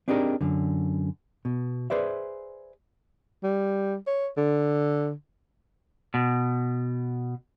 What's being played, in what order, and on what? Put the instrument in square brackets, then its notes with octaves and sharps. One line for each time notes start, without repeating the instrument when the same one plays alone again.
[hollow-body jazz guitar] C4 D4 D#4 G4 G#4 A#4
F#2 D3
B2
G#4 B4 C5 D5 E5
[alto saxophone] G3
C#5
D3
[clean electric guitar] B2